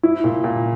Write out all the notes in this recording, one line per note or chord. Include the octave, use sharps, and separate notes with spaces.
E4
A#2
A#2